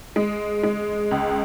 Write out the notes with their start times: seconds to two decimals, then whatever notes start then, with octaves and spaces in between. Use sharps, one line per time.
0.16 G#3
0.63 G#3
1.11 C#2